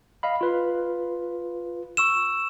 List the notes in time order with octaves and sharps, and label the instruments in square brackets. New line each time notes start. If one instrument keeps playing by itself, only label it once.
[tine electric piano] D#5 F5 B5
F4 B4
[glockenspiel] C#6 E6 E7